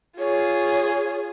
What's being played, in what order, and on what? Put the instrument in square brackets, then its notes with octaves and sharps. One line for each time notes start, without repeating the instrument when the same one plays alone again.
[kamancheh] F4 G#4 [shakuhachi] C#5